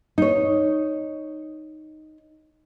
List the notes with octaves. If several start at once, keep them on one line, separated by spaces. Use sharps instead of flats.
D#4 C#5